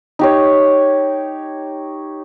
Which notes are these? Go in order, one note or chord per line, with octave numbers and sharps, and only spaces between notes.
D#4 G4 C#5